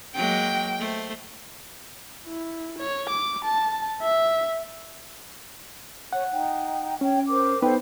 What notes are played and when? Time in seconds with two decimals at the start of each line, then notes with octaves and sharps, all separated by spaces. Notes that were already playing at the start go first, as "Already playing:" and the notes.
0.15 F#3 G#3 A#3 G5
0.79 A3 C5
2.27 E4
2.78 C#5
3.09 D6
3.44 A5
4.03 E5
6.13 C#5 F#5
6.31 D#4 G5
7.01 C#4 C#5 G5
7.29 A#4 C5 D6
7.62 B3 D#4 A4 B4 C5 G5